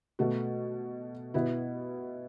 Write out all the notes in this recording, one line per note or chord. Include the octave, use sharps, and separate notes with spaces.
B2 A3 F#4
B2 B3 E4